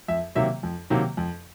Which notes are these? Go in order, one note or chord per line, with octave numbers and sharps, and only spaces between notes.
F2 E5
C3 D#3 F#3 A#3 E5
F2
C3 D#3 F#3 A#3
F2